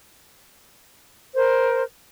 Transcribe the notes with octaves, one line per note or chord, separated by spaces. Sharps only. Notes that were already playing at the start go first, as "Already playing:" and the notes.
A#4 C5